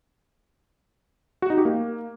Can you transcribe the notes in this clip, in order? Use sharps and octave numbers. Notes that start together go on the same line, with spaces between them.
F#4
D#4
G4
A#3